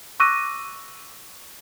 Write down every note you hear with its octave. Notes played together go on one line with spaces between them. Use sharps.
C#6 D6 E6 F#6 A#6 D#7